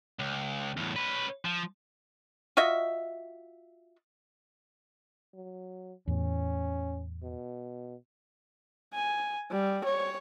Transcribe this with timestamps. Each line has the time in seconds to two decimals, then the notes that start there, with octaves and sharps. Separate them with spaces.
0.19 C#2
0.77 E2 A2
0.96 C#4 B4
1.45 F3
2.57 F4 F#4 D#5 E5
5.34 F#3
6.08 E2 A2 C#4
7.23 B2
8.94 G#5
9.52 G3
9.84 C#5